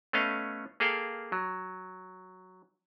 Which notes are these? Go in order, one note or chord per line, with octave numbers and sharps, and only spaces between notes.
A3 B3 C#4 D#5 F5
A#3 G#4 A4 F5 G5
F#3